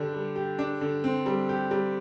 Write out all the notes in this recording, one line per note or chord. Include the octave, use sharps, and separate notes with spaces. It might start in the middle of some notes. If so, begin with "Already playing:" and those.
Already playing: D3 G3 D4 G4
G3
G4
D4
D3
C4
G3
G4
G3